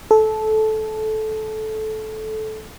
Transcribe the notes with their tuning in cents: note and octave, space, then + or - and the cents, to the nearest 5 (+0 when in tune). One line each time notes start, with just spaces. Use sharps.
A4 -15